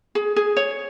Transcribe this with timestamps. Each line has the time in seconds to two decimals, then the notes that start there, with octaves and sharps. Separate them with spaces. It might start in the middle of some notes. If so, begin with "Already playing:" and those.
0.15 G#4
0.36 G#4
0.57 C#5